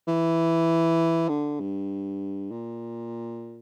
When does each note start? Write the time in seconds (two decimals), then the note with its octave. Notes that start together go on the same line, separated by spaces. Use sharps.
0.08 E3
1.29 D3
1.60 G2
2.51 A#2